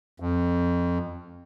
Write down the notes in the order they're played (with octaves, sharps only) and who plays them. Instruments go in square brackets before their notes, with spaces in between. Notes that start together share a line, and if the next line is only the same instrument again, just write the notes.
[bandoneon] F2